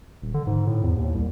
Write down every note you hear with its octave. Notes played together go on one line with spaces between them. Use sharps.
D#1
D3
G#2
A2
E2
D#2
C2